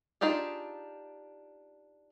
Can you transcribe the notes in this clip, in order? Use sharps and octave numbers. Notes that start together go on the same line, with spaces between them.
D4 D#4 F4 G4 G#4